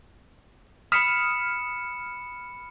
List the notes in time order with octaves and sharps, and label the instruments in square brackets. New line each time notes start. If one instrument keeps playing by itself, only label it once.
[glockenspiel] B5 C#7 E7 [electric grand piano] D#6 F6 B6